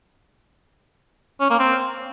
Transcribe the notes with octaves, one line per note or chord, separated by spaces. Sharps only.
C#4
A#3
C4